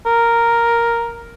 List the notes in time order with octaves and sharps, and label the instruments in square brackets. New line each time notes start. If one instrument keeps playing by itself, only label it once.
[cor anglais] A#4